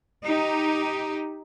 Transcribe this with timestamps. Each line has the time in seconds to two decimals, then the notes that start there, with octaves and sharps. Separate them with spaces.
0.24 D#4 G4